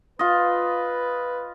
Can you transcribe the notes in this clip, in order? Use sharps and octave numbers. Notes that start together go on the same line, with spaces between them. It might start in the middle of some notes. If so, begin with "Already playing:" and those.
F4 B4 D#5